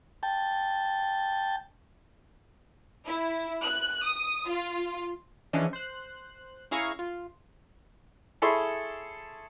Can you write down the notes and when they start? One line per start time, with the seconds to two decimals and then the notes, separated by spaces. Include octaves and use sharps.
0.23 G5 A5
3.07 E4
3.64 F#6
4.04 D#6
4.49 F4
5.53 C#3 E3 F3 G#3 C#4 D4
5.73 C5 F#6
6.71 C#4 E4 G#4 F5 A#5 C#6
6.99 F4
8.42 E4 G#4 A4 C#5 B5 C6